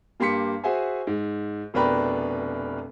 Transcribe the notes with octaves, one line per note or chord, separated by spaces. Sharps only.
G2 A#3 G4 C6 B6 C#7
F#4 G#4 C5 E5 G#5
G#2
F1 B2 D4 A#4 B4 G5